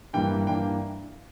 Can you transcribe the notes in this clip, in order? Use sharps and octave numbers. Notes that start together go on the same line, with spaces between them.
G2 E3 A#3 D4 G5
G2 E3 A#3 D4 G5